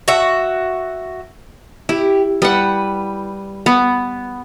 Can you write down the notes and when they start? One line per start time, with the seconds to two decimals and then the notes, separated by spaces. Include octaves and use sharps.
0.08 F#4 E5
1.89 E4 G4
2.42 G3 B4 F#5
3.66 B3